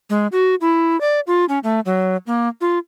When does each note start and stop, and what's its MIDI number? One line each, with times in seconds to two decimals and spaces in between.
0.10 0.27 56
0.32 0.55 66
0.61 0.99 64
1.01 1.20 74
1.27 1.45 65
1.49 1.59 61
1.64 1.80 57
1.85 2.17 54
2.27 2.48 58
2.61 2.79 65